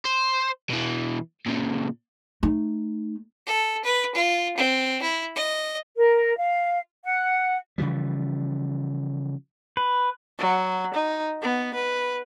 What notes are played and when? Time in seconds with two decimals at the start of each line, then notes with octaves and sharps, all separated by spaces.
0.05 C5
0.70 B2 E3
1.46 A#2 C#3
2.43 A3 D#4
3.47 A4
3.84 B4
4.14 F4
4.57 C4
5.02 E4
5.36 D#5
5.97 A#4
6.37 F5
7.04 F#5
7.78 C#3 E3 F3 G3
9.77 B4
10.39 F#3
10.94 D#4
11.42 B3
11.74 B4